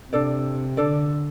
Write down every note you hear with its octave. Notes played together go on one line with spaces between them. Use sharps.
C3 D4 A4 D5
D3 D4 A4 D5